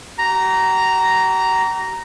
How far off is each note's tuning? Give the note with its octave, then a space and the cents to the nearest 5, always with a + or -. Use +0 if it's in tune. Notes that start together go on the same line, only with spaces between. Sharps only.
G4 -45 A#5 +0